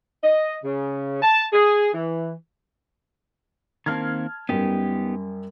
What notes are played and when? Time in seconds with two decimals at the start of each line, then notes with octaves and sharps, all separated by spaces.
0.23 D#5
0.64 C#3
1.22 A5
1.53 G#4
1.93 E3
3.86 D#3 A#3 C4 A5 F6 G#6
4.49 F#2 G3 B3 D#4 G4